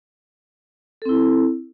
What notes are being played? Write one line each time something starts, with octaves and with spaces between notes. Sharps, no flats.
C4 E4 A4